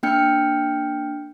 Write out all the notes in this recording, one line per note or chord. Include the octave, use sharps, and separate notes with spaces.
A#3 D4 G5 F6 G6 C#7